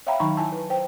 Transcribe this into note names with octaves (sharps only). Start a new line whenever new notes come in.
C#5 E5 F5 G5 A#5 B5
D#3 F#3 D#4 A#5 B5 C#6
E4 G#5 A5
B4
C5 G5